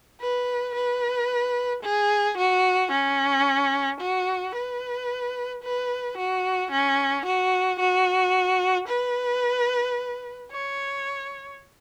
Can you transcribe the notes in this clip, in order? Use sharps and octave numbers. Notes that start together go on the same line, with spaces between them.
B4
B4
G#4
F#4
C#4
F#4
B4
B4
F#4
C#4
F#4
F#4
B4
C#5